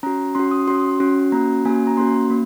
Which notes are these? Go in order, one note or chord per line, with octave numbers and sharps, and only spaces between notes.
C#4 F#4 A#5
C#4 F#4 C6
D#6
C#4 F#4 C6
C#4 F#4
A#3 C#4 F#4 A#5
A#3 C#4 F#4 G#5
G#5
A#5
A#3 C#4 F#4 C6
A#3